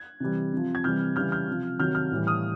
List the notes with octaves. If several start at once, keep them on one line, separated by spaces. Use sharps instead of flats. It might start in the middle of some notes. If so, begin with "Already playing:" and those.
Already playing: F#6 G#6
C3 E3 G3
C3 F3
G#6
C3 E3 G3 F6 G6
C#3 E3 G3 F6 G6
F6 G6
C3 F3
C3 D#3 F#3 F6 G6
F6 G6
A2 E3 G3
D#6 F6